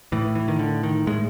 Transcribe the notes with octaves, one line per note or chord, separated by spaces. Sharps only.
A2 E3
E3
D#3
D3
D#3
A2 G#3